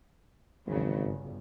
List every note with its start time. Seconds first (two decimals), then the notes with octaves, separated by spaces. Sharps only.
0.66 G#1 E2 C#3 F#3
1.00 G1